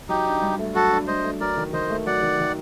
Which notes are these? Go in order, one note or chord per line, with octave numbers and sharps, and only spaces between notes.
F#3 D#4 G4
D4
G2
A3
F#3 F#4 A4
D4
G2 C5 D#5
A3
F#3 A#4 D5
D#3
D#3 C5 D#5
A3
F#3 D5 F#5
D#3
D#3